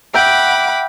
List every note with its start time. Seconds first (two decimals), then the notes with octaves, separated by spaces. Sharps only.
0.14 E5 F#5 G5 B5 D6